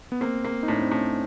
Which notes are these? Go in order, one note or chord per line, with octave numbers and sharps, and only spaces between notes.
B3
A#3 C4
A#3
D#4
A2 D4
C4
A2 C#4